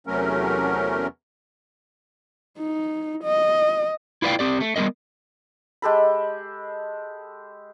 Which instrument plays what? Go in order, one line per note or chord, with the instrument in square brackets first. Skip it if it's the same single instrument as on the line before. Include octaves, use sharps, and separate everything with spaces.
[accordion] E2 C3 F#3 A3 C#4 A#4
[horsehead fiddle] D#4
D#5
[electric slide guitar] E4 F4 B4 D5 F5 G5
C4 G4 D5
A3
G3 B3 C#4 A#4 D#5
[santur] G#3 G4 A4 B5